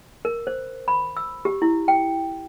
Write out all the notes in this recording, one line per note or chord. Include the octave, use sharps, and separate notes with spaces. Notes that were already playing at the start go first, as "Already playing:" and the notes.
A#4
C5
B5
E6
G4
E4
G5